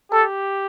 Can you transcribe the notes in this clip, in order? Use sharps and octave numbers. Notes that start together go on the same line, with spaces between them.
G4 A4